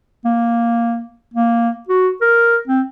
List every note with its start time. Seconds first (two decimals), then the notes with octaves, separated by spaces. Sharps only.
0.25 A#3
1.34 A#3
1.88 F#4
2.21 A#4
2.68 C4